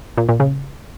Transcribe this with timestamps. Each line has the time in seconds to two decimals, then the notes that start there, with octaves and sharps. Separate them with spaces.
0.18 A#2
0.29 A#2
0.40 C#3